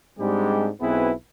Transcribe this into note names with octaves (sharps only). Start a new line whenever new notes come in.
G#2 G3 G#3 C4 D4 G4
B1 B3 C4 E4 G#4 B4